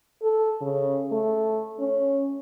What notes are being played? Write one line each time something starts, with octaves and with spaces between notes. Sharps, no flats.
A4
C#3
A3
C#4